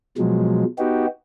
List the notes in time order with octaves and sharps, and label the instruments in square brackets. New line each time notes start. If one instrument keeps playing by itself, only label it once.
[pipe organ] B2 F3 F#3 G#3
B3 D#4 F#4 G4